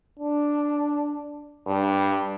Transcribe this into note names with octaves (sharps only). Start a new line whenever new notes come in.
D4
G2